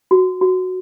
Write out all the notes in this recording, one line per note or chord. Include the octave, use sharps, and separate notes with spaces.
F#4
F#4